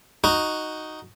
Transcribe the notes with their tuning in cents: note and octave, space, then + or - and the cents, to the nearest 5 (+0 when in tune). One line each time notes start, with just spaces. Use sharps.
D#4 +0 F#4 +0